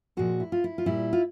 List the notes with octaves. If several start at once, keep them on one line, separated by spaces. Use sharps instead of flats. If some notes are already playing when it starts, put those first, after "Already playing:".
A#2 F3 G#3 F#4
E4
F4
E4
F4
A#2 G3 E4
F4